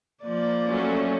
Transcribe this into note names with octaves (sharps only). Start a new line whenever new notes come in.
F3 A#3 D5
F#3 A3 C#4